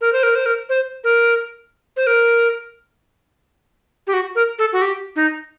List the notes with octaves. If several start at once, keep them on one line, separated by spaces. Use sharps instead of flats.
A#4
C5
A#4
C5
A#4
C5
A#4
C5
A#4
G4
F#4
A#4
A4
F#4
G4
D#4